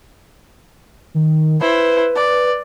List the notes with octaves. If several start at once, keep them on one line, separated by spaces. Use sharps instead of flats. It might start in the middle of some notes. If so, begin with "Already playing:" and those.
D#3
E4 B4 C5
D5